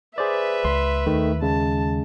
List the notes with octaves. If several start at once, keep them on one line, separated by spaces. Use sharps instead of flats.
G#4 B4 C5 D5 E5
C#2 C6
D#2 D#3 A3
C#3 G#3 A5